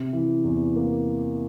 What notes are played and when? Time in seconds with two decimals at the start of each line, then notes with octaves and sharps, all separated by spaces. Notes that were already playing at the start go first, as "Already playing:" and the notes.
Already playing: C3
0.13 E3
0.44 E2
0.76 A#3